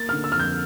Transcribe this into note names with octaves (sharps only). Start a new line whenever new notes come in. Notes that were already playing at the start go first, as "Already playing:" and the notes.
Already playing: A#3 A6
D3 F6
E6
F2 F6
G6